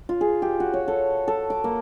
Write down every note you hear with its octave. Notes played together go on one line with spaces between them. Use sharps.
F4
G#4
G4
F#4
C#5
A4
A4
D6
A#3